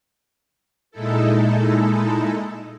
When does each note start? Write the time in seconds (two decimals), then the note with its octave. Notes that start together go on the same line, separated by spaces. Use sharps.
0.91 A#2 G#3 D#4 E4 A4